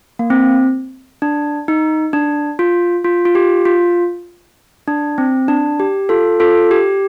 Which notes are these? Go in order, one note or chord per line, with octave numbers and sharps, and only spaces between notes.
A#3
C4
D4
D#4
D4
F4
F4
F4
G4
F4
D4
C4
D4
G4
F4 A4
F4 A4
G4